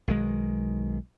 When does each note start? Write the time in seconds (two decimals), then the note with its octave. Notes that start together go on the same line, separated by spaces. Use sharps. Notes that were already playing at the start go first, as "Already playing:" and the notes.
0.08 B1 D#3 G#3